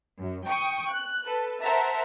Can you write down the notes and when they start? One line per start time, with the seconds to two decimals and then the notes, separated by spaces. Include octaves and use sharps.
0.18 F#2
0.48 G5 C#6 D#6
0.90 F#6
1.25 A4 B4
1.61 A#4 C5 E5 F#5 A5 A#5